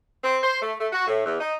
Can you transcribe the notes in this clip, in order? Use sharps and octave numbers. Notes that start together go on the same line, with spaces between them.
C4
C5
A3
A3
F#4
A2
E2
D#4